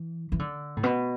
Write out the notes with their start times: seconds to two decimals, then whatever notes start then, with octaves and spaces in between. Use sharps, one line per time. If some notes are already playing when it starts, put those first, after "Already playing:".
Already playing: E3
0.32 E3
0.39 D3
0.77 A2
0.83 B2